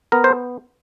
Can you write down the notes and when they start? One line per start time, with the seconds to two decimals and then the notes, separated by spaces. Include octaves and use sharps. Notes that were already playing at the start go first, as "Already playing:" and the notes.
0.12 B3 A#4
0.24 C5